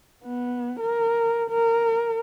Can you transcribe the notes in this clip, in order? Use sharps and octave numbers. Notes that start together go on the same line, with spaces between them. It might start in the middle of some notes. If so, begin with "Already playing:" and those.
B3
A#4
A#4